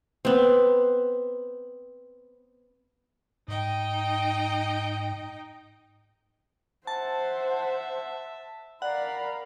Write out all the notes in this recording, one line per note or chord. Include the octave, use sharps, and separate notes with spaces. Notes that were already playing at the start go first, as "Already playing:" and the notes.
B3 C4
G#2 D#4 D#5 G5
C5 E5 F#5 A5
A#4 D5 F5 F#5 B5